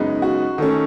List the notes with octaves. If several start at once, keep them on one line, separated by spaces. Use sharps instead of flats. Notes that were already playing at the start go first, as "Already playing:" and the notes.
Already playing: F#2 C#3 G#3 B3 D#4
F#4
D#3 A3 C#4 A4